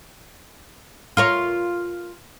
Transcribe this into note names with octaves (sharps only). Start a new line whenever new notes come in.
F4 A#4 C#5 F6